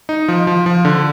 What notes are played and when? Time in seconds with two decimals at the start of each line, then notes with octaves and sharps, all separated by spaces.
0.09 D#4
0.28 F3
0.47 F3
0.66 F3
0.85 D3